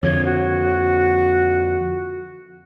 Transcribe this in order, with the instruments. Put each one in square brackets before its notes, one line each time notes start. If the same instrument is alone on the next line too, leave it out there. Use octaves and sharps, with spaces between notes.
[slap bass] F2 D3 F3 [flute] C#5
[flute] F#4